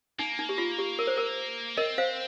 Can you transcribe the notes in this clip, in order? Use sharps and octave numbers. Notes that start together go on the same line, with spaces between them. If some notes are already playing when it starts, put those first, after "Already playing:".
A#3 D#4
D#4
G4
F4
G4
A#4
C5
A#4
C4 A#4 D#5
C5 F5